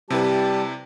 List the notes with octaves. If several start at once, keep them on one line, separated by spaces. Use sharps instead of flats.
C3 G3 E4 G4 B4 A5